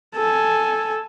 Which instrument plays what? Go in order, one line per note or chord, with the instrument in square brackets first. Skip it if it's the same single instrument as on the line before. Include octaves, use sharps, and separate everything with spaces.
[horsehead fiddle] A4 G#5